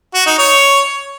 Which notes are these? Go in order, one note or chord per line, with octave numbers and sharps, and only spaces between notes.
F#4
D#4
C#5